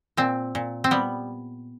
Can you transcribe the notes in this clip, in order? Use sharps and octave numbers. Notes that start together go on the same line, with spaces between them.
A#2 C4
A#2
C4
G3 B3